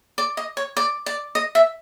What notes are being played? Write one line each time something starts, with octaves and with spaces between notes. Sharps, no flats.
D5
D#5
C#5
D5
D5
D#5
E5